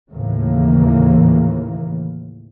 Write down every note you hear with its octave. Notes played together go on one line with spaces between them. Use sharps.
D#2 A2 C#3 E3 A#3